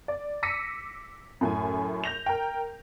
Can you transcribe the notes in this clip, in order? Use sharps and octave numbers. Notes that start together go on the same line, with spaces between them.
D5
D6 E6 A#6 B6 C#7 D#7
F#2 A2 G#5
G6 A#6 F7
A#4 G5